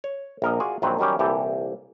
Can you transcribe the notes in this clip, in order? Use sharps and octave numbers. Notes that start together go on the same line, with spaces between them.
C#5
A#1 A#4 D#5
F4 F#4 G#4 D5
A#1 D#3 F#3 C4 B4
D#3 F#3 G3 C#4 G4
C2 A#2 E3 G4 A4